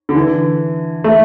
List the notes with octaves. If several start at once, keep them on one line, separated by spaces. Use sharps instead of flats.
D3
E3
A3